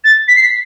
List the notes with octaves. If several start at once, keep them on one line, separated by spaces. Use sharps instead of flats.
A6
B6
C7
B6